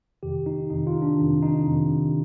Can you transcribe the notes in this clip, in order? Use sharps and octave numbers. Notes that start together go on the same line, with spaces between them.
F2 C3 D#3 G4
D#4
F2 C3 D#3 D#4
F4
D4
F2 C3 D#3
D#4
F2 C3 D#3